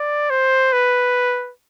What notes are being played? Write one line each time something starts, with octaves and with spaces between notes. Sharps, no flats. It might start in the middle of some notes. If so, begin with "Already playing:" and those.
Already playing: D5
C5
B4